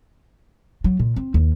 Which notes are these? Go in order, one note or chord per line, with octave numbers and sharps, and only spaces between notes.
F#3
A#2
C4
D#2